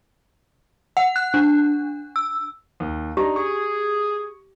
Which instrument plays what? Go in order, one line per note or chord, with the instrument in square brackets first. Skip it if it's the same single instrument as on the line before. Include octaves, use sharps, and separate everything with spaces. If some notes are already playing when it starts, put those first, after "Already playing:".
[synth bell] F#5
F#6
D4
E6
[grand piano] D#2
[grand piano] D4 D#4 A#5 [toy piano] G4
[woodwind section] G#4 [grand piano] C#6